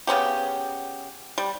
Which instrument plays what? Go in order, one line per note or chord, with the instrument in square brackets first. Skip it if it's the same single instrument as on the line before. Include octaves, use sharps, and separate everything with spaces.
[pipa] C#3 B3 C#4 G4
G3